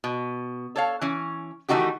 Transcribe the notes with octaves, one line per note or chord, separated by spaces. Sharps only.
B2
A4 C#5 F5
E3 C#4
D#3 E3 A3 D#4 F#4 G4